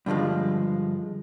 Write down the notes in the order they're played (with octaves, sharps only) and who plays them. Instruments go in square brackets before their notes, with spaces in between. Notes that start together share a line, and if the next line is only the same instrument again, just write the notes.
[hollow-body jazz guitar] G2 D3 D#3 F3 G#3